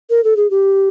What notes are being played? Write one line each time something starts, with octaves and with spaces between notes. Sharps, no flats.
A#4
A4
G#4
G4